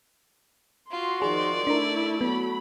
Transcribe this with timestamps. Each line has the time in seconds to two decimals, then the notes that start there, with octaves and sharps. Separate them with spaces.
0.91 F4 F#4 C6
1.22 D#3 F3 G#4 D5
1.67 A3 D4 E4 A#4
2.21 F#3 B3 B5